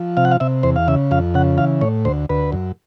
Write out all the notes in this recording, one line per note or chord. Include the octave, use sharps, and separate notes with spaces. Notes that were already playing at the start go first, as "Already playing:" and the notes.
Already playing: F3
C3 F5
F#5
F5
C3 E5
E2 C5
F5
C#3 E5
F2 F5
C#3 F#5
E3 F5
A2 C#5
D2 C5
D2 B4
F#2